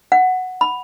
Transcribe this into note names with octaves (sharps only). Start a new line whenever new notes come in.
F#5
B5